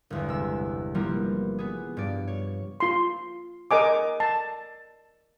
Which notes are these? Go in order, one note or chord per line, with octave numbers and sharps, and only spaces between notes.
G1 E2 G#3
C3 E6
F3 G3 A#3 B3 E4
B3 G#4
G2 D5
C#5
F4 C6
A#4 D#5 G#5 D6
A5